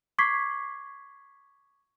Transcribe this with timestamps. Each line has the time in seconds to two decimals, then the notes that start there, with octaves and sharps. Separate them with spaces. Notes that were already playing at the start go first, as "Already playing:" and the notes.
0.19 C#6 D6 G#6 B6 C7